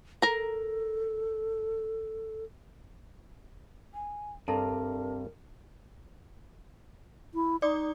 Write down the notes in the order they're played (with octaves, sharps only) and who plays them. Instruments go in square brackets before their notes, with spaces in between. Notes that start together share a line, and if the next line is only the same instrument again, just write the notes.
[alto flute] A4 [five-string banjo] A#4 A#5
[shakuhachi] G#5
[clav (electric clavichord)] G2 A#5 [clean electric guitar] C3 [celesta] A4 A5 [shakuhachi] A#4
[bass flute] E4
[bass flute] D#4 [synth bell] D5 D6 D#6